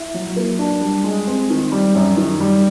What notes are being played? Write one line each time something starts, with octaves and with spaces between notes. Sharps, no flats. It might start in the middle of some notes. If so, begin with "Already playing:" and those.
Already playing: E4
F#3
A#3
D4
G3
G#3
C4
D#3
G3
F#2
D#3
G3